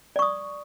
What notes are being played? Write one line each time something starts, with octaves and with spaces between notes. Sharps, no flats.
D5 C#6 D#6